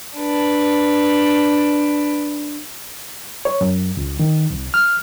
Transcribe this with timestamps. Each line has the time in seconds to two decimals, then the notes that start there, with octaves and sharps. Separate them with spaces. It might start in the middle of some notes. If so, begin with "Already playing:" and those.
0.17 D4 B4
3.45 C#5
3.61 F#2
3.97 C#2
4.19 D#3
4.50 C2
4.74 F6